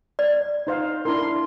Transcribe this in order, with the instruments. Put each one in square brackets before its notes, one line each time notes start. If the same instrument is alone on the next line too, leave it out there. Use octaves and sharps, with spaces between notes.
[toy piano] D5
[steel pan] D#4 C5 F5
[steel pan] D4 E4 A#4 [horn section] C6